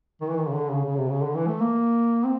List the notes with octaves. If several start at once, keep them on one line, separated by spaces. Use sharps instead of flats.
D#3
E3
D#3
C#3
D3
C#3
C#3
C3
C#3
D3
E3
A3
A#3
C4